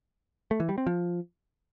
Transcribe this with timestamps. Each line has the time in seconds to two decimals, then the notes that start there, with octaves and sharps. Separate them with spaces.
0.51 A3
0.60 E3
0.69 G3
0.78 C4
0.87 F3